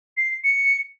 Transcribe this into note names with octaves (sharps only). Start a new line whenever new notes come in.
C7
C#7